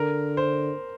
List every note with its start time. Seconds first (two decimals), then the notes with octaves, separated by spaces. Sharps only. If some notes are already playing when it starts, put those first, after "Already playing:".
Already playing: D3 A#4
0.37 C5